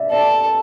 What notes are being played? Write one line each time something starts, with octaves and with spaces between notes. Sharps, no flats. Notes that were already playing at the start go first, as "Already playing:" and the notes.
Already playing: D5 E5
A4 D5